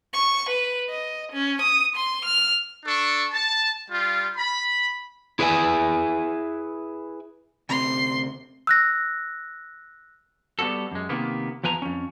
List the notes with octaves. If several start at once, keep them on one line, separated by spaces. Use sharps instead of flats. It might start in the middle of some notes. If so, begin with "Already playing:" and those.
C#6
B4
D#5
C#4
D#6
C6
F6
D4 A4 C#6
A5
G3 F4
B5
E4 G#4 B4 C#5 E5 G#5
D2 C3 C4 C6
E6 F#6 A#6
G3 B3 C#4 F#4 A4
F#2 G#3
C3 D#3 A#3 B3
E2 F3 B4 G#5 A#5
F2 C#4